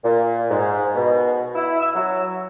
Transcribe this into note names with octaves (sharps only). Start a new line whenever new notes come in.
A#2
G#2
B2
E4
E6
F#3